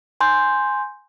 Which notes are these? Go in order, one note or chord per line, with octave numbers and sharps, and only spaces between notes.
G#5 C6 G6